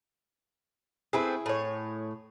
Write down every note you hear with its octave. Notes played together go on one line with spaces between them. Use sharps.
A3 C4 E4 G#4 B4
A2 C#5